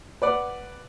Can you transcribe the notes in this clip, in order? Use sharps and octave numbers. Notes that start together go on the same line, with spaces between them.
B4 D5 F#5